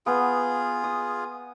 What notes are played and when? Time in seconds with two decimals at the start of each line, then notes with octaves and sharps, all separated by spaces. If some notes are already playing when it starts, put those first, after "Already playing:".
0.06 B3 F4 G#4
0.84 D#6